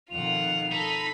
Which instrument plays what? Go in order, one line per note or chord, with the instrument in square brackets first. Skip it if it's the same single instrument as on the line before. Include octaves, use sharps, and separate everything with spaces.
[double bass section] F2 B2 D#3 [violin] F4 F#5 [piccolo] F7
[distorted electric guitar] D#4 [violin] A4 B5